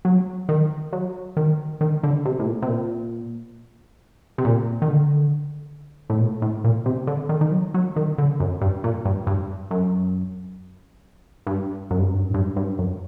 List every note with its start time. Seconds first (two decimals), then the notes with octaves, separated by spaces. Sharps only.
0.05 F#3
0.49 D#3
0.93 F#3
1.37 D#3
1.81 D#3
2.03 D3
2.25 C3
2.39 A2
2.46 A#2
2.62 C3
2.68 A#2
4.38 C3
4.45 A#2
4.82 D#3
4.88 D3
6.10 A2
6.20 A#2
6.42 A2
6.64 A#2
6.86 C3
7.07 D3
7.29 D#3
7.41 D#3
7.52 F#3
7.74 F#3
7.96 D#3
8.18 D3
8.40 F#2
8.61 G2
8.84 A#2
9.05 G2
9.27 G2
9.71 F#2
11.47 G2
11.91 F#2
11.99 G2
12.06 F#2
12.14 G2
12.23 F#2
12.30 A2
12.34 G2
12.56 G2
12.79 F#2